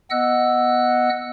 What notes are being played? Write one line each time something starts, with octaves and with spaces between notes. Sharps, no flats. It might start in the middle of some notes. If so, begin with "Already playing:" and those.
B3 D#5 F#5 E6 F#6